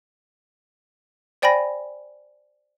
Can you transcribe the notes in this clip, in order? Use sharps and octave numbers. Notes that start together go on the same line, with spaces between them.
C5 D5 G5 G#5 B5 A#6